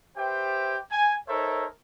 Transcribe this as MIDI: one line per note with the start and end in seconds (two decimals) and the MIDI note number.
0.17 0.77 67
0.17 0.77 71
0.17 0.77 72
0.17 0.77 76
0.17 0.77 79
0.91 1.14 80
1.28 1.65 63
1.28 1.65 69
1.28 1.65 70
1.28 1.65 72
1.28 1.65 73
1.28 1.65 76